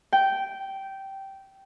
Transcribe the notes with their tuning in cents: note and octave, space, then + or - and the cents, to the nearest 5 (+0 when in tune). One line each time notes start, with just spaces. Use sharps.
G5 -10